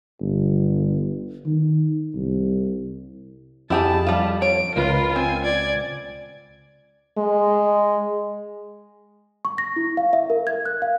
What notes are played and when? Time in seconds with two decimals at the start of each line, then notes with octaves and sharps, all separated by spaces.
0.20 G1
1.46 D#3
2.15 C2
3.70 F2 E4 G4 G#4 A5
4.07 G3 F4
4.42 C#5 D7
4.76 C#2 F4 A#4 B4
5.16 C4 G#5
5.44 D5 G#6
7.18 G#3
9.45 C#6
9.58 A#6
9.76 E4
9.97 F5
10.13 E5
10.30 A#4
10.47 G#6
10.66 F#6
10.82 F5